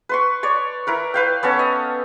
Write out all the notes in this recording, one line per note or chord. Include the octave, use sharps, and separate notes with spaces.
B4 C6 C#6
C#5 D5 C#6
E4 A#4 B4
B4 F5 G5
B3 C#4 A4 C#5
D#5